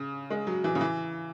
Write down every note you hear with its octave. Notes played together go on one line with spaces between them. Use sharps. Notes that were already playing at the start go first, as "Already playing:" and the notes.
Already playing: C#3
G#3
F#3
E3
C#3
E3